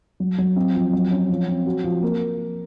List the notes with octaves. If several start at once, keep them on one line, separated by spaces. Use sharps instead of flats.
F#3
F#3
C4
F3
F#3
C#4
F3
C4
F#4
F3
A#3